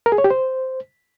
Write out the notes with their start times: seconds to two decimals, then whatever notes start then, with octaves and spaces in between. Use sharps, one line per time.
0.06 A#4
0.12 G#4
0.18 C#5
0.24 G4
0.30 C5